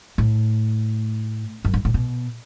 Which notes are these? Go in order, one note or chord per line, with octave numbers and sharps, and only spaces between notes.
A2
F#2
G#2
A2
B2